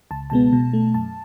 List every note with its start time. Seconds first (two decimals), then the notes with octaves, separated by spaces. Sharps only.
0.11 C#2 A5
0.30 B2 G#3 B3 A5
0.53 B2
0.73 A3
0.94 F#2 A5